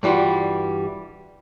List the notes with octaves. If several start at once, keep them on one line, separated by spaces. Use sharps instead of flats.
G2 E3 G3 F4 F#4